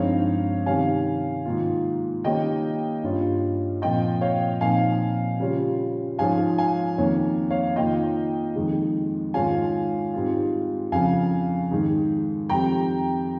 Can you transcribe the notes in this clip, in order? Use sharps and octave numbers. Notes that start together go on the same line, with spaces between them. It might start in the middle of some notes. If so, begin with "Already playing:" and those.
Already playing: G2 F3 G#3 C4 D#4 C#5 F5
C3 D#3 G3 C#4 F5 G#5
G#2 D#3 A#3 F4
D#3 G3 A#3 C#4 D#5 G5
G2 G3 C#4 F4
A#2 F3 C4 F4 D#5 G5
C#5 F5
A#2 F3 C4 D#4 F5 G#5
C#3 G3 C#4 F4
G#2 F3 G#3 C#4 F4 F5 G#5
F5 G#5
F2 D#3 A#3 C#4 C#5
C#5 F5
D#3 A#3 F4 D#5 G5
F2 D#3 G#3
G#2 D#3 G#3 C#4 F4 F5 G#5
G#2 G3 C4 F4
F2 C#3 F3 F5 G#5
G#2 D#3 G#3
F2 D#3 G3 C4 G5 A#5